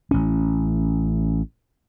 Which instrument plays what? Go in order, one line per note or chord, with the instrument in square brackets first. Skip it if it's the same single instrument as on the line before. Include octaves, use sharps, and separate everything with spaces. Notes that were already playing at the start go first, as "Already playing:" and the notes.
[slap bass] A1 C#4